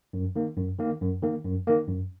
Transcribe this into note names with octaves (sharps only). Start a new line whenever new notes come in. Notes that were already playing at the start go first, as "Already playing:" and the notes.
F#2
D#3 A#3
F#2
D#3 A#3
F#2
D#3 A#3
F#2
D#3 A#3
F#2